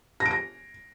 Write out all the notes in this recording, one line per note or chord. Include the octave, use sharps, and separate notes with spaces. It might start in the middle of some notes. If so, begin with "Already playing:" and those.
A#6
D7
A#6